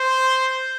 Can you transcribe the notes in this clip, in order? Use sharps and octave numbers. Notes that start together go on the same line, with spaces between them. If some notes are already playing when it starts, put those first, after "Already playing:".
Already playing: C5